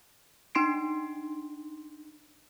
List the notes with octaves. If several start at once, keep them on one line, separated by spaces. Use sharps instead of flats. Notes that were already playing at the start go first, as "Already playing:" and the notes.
D4 D#4 C6 C7 D7